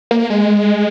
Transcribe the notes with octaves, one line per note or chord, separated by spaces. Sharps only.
A#3
G#3